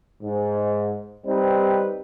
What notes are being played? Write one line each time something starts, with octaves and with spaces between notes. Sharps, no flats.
G#2
G3 C4 D#4 B4